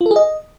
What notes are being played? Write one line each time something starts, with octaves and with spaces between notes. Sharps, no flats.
F4
A4
G#4
D#5